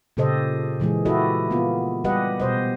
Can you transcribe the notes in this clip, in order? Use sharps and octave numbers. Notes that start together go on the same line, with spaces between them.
A#2 C#3 G4 A4 C5 D#5
A#2 E3 G#3 G#4
E4 F#4 G4 A4 B4 D#5
A#3 B3 F4
G3 G4 B4 D#5 F#5
B2 C5 D#5